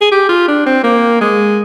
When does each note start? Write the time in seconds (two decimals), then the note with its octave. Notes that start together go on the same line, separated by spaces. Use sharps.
0.01 G#4
0.12 G4
0.29 F4
0.48 D4
0.66 C4
0.84 A#3
1.21 G#3